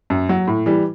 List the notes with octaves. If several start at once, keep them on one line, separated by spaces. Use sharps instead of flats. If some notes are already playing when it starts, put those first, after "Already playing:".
F#2
F#3
A2
E3 G3